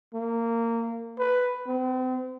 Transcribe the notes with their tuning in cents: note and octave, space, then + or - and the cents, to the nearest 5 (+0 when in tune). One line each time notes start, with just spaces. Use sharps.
A#3 -20
B4 +5
C4 -35